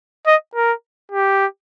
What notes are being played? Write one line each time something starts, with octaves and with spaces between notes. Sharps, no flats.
D#5
A#4
G4